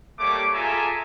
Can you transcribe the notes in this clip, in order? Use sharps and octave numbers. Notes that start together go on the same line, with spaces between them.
G3 A3 A#3 C#5 D6
F4 G#4 A4 E5 G#5 A#5